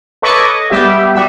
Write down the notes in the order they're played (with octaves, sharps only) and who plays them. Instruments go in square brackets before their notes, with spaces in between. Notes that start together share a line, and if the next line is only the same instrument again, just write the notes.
[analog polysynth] A4 B4 C#5 D#5 C#6 D6
D#5
G3 B3 G4 E5
G3 F#4 E5